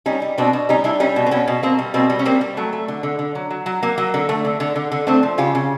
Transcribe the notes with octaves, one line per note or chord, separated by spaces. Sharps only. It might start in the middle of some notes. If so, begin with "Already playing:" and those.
G3 C#4 D#4
G3
B2 C4 D4
B2
G3 C#4 D#4
G3 D4 E4
G3 C#4 D#4
B2
C4
B2 B3 C#4
B2
B2 A#3 C4
G3
B2 A#3 C4
G3
C#4
G3 A#3 C4
G3
F#3 A3
A3
D3
D3
D3
F#3
F#3
F#3
F#3 A#3
F#3
D3
A3
D3
D3
D3
D3
A3 C4 D4
F3
C#3 F4 G4
C#3